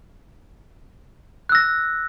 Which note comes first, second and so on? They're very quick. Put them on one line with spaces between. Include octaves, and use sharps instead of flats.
F#6 E6 A#6